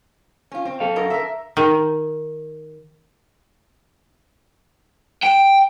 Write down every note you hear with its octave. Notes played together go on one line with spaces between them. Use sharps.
C#4 F4
C4
A4 F5
F#2 A#4 D#5
A#4 E5
D#3
G5